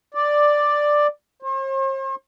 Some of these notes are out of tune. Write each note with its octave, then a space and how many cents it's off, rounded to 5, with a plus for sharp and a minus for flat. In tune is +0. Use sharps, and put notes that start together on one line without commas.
D5 +5
C5 +45